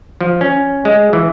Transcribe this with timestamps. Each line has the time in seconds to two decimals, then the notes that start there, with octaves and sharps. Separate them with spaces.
0.21 F3
0.41 C#4
0.85 G#3
1.13 E3